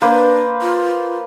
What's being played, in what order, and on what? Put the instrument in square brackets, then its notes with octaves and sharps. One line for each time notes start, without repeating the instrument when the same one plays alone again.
[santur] A#3 B4 C5 [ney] D4
[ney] F4